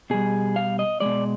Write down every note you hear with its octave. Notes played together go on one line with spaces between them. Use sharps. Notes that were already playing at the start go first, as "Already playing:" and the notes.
B2 G3 G#4
F5
D#5
B2 G#3 D5